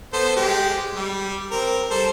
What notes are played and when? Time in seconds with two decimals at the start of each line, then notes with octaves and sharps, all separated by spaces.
0.13 B3 A4 C5
0.36 G#3 G4
0.95 G3
1.51 C4 A#4
1.91 G3 A4 C5